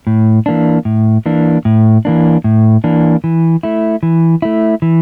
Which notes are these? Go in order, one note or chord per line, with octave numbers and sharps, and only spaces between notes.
A2
E3 A#3 D4
A2
E3 A#3 D4
A2
E3 A#3 D4
A2
E3 A#3 D4
E3
A3 E4
E3
A3 E4
E3